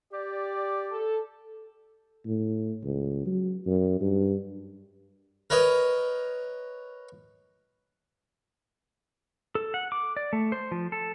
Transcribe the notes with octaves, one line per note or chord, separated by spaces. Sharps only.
G4 D5
A4
A2
C#2
F#3
F#2
G2
A#4 B4 C#5 D#5
A4
F#5
D6
D5
A3
C5
F3
A4